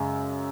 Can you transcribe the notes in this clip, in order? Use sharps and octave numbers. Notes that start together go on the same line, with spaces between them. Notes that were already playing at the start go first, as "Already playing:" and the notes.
Already playing: F#2 C#3 G#3